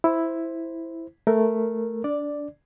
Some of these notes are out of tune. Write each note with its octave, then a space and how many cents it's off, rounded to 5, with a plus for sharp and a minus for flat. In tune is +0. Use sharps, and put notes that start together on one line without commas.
E4 +0 C5 +0
A3 +0 A#4 +0
D4 -20 D5 +0